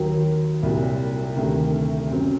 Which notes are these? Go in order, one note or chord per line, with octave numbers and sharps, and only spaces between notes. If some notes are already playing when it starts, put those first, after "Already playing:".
Already playing: D#2 D#3 F#3
C2 A#2 F#3
D2 C3 D#3
F#2 F#3 C4